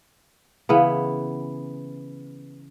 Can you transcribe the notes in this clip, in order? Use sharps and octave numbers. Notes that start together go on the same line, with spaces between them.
C#3 E3 B3